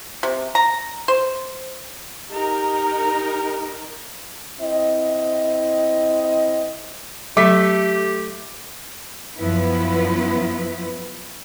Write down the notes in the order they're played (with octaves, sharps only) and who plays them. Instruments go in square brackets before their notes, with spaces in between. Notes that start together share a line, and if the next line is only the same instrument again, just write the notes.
[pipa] C3
A#5
C5
[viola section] D#4 A#4 [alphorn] G4 [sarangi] A#5
[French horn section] C4 E4 D#5
[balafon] F#3 [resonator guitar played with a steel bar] A3 [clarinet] G4 [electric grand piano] D6 B6
[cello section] F#2 F3 B3 E4 B4